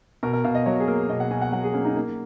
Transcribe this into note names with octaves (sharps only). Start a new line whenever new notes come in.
B2 A#4
A#4
B2 F5
D#5
F#3 C#5
G#4
A#3 A#4
B2 D#5
F#5
B2 G#5
F#5
F#3 F#5
G#4
A#3 C#4
D#4
A#3